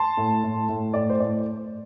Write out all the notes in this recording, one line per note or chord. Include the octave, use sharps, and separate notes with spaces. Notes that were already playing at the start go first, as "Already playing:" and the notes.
Already playing: A5 C6
A2
A2
A2
A2 D5
C5
A2 D5